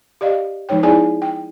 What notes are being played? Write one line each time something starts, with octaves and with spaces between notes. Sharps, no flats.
G4 D5 D#5 F5
F3 G#3 D#4 C#5 G5
B3 D#4 E4 G#4 D5 G#5
G5